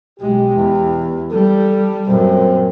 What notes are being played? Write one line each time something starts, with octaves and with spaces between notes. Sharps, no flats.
B1 G#3 G4
E2
G3 A4
F#2 A#2 C4